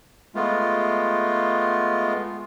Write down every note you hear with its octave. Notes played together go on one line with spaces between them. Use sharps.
G#3 A3 B3 F4